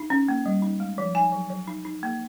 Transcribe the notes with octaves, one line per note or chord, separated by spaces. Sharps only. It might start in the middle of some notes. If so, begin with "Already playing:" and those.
Already playing: D#4
C#4
A#3
G3
D#4
G#3
F3
D#4 G#5
F#3
F#3
D#4
D#4
A#3